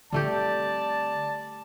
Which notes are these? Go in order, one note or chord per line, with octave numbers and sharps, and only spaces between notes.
D3 G3 A3 C4 G4 D5 A5